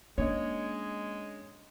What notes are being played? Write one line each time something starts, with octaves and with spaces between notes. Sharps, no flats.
G#3 A#3 C#4 D4 C#5 D#5